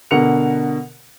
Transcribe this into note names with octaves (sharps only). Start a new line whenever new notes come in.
B2 D3 A#4 F#5 C#7 F7